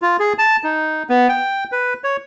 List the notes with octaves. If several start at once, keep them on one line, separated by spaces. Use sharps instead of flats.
F4
G#4
A5
D#4
B3
G5
B4
C#5